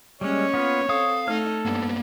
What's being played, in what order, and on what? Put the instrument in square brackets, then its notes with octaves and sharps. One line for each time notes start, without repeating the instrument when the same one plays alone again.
[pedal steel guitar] G3 G#3 [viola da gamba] A#3 C#4 [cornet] C#5
[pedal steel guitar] B3 F4
[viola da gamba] C4 A4 [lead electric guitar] F5 [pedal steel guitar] D#6
[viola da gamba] A3 D#4 [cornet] A4 [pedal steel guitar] C#5 F6
[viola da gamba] G2 [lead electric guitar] A#3 B3